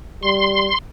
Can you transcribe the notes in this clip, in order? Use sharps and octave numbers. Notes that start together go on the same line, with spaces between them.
G3 C6